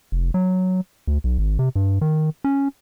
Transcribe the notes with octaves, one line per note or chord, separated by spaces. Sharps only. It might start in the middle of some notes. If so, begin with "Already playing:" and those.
F1
F#3
D2
B1
G#1
C3
G2
D#3
C#4